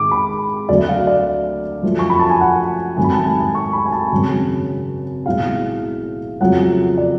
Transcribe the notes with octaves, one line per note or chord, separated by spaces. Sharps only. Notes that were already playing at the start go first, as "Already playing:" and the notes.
Already playing: G#1 G#2 G#3 D6
B5
D2 D3 F#3 A3 D5
F5
D5
F#2 F3 A3
C#6
B5
A5
G#5
F#5
G#1 G#2 F#3 A3 G#5
B5
A5
G#5
A5
C#6
B5
G#5
A5
G#1 F#2 C#3
B1 A2 G#3 F5
F2 C#3 F#3 A3 F#5
D5